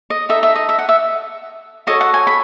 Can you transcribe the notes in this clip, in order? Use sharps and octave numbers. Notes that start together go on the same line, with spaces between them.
D#5
D#4 A4 D#5 E5
E5
D#5
E5
F#5
E5
F#4 A4 C#5 D#5
F#5
G#5
B5